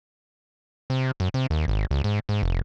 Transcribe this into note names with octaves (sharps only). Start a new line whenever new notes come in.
C3
F#2
C3
D#2
G#1
C#2
G#2
G#2
F1